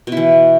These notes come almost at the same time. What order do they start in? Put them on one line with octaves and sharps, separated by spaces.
B2 E4 E3